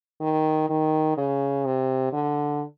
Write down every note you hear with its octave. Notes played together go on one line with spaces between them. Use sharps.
D#3
D#3
C#3
C3
D3